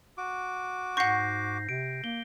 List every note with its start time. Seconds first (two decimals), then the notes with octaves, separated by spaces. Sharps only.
0.18 F#4 D6
0.97 G#2 F#5 C#6 G6 A#6 C7
1.69 C3 D7
2.04 A#3 G7